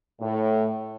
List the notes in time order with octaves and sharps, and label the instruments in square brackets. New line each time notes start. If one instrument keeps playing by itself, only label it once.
[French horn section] A2